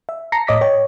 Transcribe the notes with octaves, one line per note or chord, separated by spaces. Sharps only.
E5
A5 A#5 A#6 C7 C#7
A2 C#5 D#5 D6 A#6 B6
C#5 G5